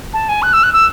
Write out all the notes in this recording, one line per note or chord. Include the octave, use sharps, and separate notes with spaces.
A5
G#5
F#6
E6
F#6
E6